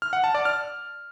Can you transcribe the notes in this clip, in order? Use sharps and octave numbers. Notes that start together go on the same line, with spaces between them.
F6
F#5
A5
D5
F6